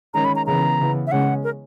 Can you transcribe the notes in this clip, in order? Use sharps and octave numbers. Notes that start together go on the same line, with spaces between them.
D#3 G#3 C#4 A#5
B5
A#5
C#3 E3 B3 A#5
C#3 E3 B3
E5
C#3 G#3 C#4 F#5
A#4